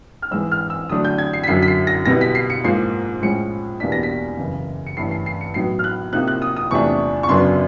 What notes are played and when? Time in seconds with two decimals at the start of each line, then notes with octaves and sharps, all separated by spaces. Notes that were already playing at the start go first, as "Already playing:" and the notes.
0.22 F6
0.31 G#2 E3 G#3 E6
0.52 F6
0.70 E6
0.89 D3 F#3 A3 D4 D#6
1.05 G6
1.18 G#6
1.33 C7
1.44 B6
1.47 F#2 D3 F#3 C7
1.63 B6
1.68 C7
1.87 A#6
2.05 B2 G3 B3 E4 A#6
2.21 B6
2.35 C7
2.50 C#7
2.64 G#2 F3 A#3 C7
3.22 A2 F3 G#3 C#4 C#7
3.80 E2 B2 G3 A#3 D4 B6
3.92 A#6
4.03 B6
4.38 F#2 C#3 E3
4.87 C#7
4.97 G2 E3 A3 C#4 C7
5.11 C7
5.26 C7
5.41 C#7
5.54 A2 F#3 B3 D#4 C7
5.79 F6
5.84 F#6
6.13 C3 F3 A#3 D#4 F#6
6.28 F#6
6.42 D#6
6.57 D#6
6.71 E2 C3 F3 A3 D4 C#6
7.23 C#6
7.29 F#2 C#3 F#3 B3 D4 C6